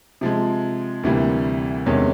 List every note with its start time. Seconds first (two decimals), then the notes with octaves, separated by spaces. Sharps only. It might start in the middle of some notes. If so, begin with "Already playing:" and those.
0.21 C3 F3 G#3
1.03 D2 C3 E3 G3 A#3
1.86 E2 C3 D#3 G#3 C#4